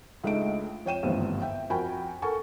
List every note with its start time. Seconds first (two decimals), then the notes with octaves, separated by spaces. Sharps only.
0.24 C#2 G#3 A3 D4 D#4 D7
0.85 F2 C#5 G5 D#7 E7
1.03 G1 D#2 G#2 C3 E3 F3
1.42 E5 G5
1.70 F2 F#4 A#4 G5 G#5 B5
2.22 A4 A#4 F#5 G#5 C#6